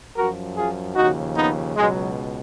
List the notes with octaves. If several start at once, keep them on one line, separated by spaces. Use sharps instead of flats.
F#2 F3 F#4 A#4
F4 G#4
D#2 C#3 F3 D#4 F#4
B3 D#4
C#2 B2 F#3 G#3